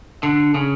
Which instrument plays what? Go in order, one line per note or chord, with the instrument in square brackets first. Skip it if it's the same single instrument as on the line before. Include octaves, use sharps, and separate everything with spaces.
[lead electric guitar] D3
C#3